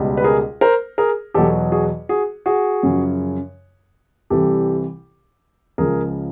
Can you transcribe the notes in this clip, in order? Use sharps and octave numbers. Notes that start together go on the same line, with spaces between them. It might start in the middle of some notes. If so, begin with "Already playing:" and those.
Already playing: C#2 B2 G3
B4
G#4 A#4
A#4 C5
G#4 A#4
E2 B2 F#3 G4 A4
F#4 G#4
F#4 G#4
F#4 G#4
F#2 C#3 F3
C2 C3 E3 G3 G4 A4
C#2 C#3 F3 G#4 A#4